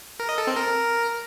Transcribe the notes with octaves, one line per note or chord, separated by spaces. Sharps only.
A#4
D#5
A4
C4
A#4